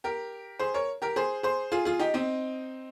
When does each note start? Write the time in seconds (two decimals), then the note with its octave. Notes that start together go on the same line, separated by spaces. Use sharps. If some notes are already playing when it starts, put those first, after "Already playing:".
0.04 G4 A#4
0.59 G#4 C5
0.74 A#4 C#5
1.02 G4 A#4
1.16 G#4 C5
1.43 G#4 C5
1.72 F4 G#4
1.85 F4 G#4
1.99 D#4 G4
2.14 C4 D#4